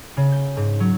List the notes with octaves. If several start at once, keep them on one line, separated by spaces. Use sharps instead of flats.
C#3
G6
G#2
F#3